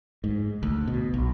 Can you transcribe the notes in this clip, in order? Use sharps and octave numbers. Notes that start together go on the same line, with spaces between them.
G#2
D2
B2
B1